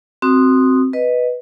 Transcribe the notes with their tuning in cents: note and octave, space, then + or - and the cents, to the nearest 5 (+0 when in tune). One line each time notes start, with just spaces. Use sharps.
C4 +0 F#4 +0 D#6 -10
B4 +0 D#5 +0